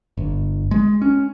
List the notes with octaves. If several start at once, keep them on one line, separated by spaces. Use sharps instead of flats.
G1
G#3
C#4